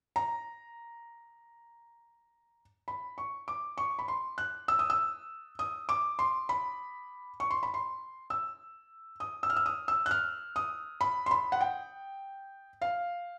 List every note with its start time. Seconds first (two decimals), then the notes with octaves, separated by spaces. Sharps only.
0.16 A#5
2.88 B5
3.18 C#6
3.48 D6
3.78 C#6
3.99 B5
4.08 C6
4.38 F#6
4.68 E6
4.79 D#6
4.90 E6
5.59 D#6
5.89 D6
6.19 C6
6.49 B5
7.40 C#6
7.51 C6
7.63 B5
7.74 C6
8.30 E6
9.20 D#6
9.43 E6
9.50 F6
9.56 E6
9.66 D#6
9.88 E6
10.06 F#6
10.11 F6
10.56 D#6
11.01 B5
11.26 C6
11.31 B5
11.52 F#5
11.61 G5
12.82 F5